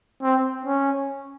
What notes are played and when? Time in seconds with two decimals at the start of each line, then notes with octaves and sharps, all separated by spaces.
0.22 C4
0.65 C#4